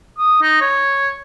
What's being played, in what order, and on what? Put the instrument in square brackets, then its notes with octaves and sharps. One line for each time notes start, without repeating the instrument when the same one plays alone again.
[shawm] D#6
D#4
C#5